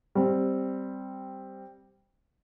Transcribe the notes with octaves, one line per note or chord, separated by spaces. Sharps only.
G3 C4